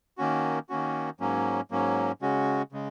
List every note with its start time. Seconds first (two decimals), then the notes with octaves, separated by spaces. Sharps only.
0.18 D#3 A#3 C#4 F#4
0.69 D#3 A#3 C#4 F#4
1.20 G#2 F#3 A#3 C#4
1.71 G#2 F#3 A#3 C#4
2.22 C#3 G#3 C#4 F#4
2.72 C#3 G#3